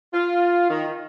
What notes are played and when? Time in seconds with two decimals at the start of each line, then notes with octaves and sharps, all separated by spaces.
0.14 F4
0.70 D#3